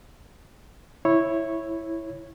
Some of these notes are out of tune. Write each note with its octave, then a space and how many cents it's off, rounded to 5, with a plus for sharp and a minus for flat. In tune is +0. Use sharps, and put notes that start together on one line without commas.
E4 +0 C#5 -10